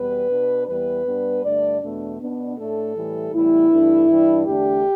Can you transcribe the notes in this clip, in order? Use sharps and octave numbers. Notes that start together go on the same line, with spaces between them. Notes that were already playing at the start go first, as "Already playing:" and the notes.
Already playing: E2 B2 G3 B3 B4
B2 B3 D4
E2 E3 G3 B3 B4
G2 G3 B3 D4
G2 D3 A3 D4 D5
E2 B2 A3 D4
B2 B3 D4
A2 A3 D4 A4
A2 E3 G3
A2 E3 G3 B3 E4
G2 E3 A3 D4
G2 E3 G3 D4
E2 D3 A3 D4 G4